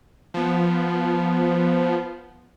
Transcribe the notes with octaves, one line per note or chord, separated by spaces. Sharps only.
F3 B3